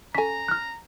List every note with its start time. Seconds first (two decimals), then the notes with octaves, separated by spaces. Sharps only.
0.15 C#4 A4 G#5 A#5 B6
0.48 F6 F#6